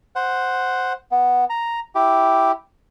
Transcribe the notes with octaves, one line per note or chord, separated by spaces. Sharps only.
C5 F#5
B3
A#5
E4 G4